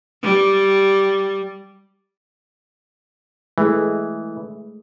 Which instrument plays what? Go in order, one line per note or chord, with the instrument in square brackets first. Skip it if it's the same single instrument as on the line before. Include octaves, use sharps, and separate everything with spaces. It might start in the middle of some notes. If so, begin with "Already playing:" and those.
[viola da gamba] G3
[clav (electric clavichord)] E3 [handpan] G#3 A3 G#4